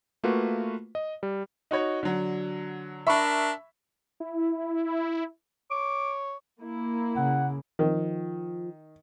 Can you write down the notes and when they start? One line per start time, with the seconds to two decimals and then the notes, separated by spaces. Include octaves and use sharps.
0.24 A3 A#3 F4 F#4 B4
0.95 D#5
1.23 G3
1.71 D#4 F#4 C#5
2.03 D3 F#3
3.07 D4 A#4 E5 B5 C#6
4.20 E4
5.71 C#5 D6
6.60 A#3 E4
7.16 C#3 F#5
7.79 D#3 F3